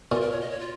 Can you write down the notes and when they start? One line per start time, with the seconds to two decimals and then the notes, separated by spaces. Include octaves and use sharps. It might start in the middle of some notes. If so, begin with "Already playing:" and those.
0.12 A#2 F4
0.21 A#4
0.31 C#5
0.41 D#5
0.50 C#5
0.60 F4